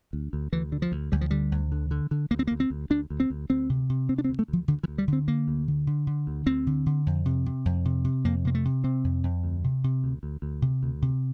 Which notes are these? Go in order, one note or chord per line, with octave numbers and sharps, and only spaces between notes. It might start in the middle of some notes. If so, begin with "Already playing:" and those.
D2
D2
D2 E3
D3
F3
D2
D2 G3
F3
D3 G3
D2
D3
D3
D3
D2 A#3
C4
A#3
D2
C4
D2
D2 D4
D2
C4
D2
D2 C4
C3
C3
C3 C4
D4
C4
D2
A3
D2 F3
D2 D3
E3
D2
G3
D3
C4
D3 A#3
D2
D3
D3
D3
D2
D2 C4
D3
D3
F2
C3
C3
F2
C3
C3
F2 A#3
C3 A#3
A3
C3
C3 C4
F2
F2
D2
C3
C3
D2
D2
D2
C3
D2
C3